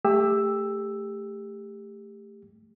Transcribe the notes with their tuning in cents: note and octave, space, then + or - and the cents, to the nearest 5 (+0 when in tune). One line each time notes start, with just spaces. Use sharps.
A3 +5 G4 +30 E6 +0